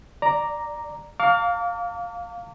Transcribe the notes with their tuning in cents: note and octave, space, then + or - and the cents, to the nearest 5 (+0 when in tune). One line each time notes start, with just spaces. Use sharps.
D5 +0 A#5 +0
F5 +15 A#5 -45 D6 -35